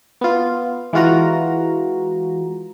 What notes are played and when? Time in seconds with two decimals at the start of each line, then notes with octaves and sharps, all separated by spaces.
0.21 B3 F4
0.93 E3 G#3 F4 F#4 A#5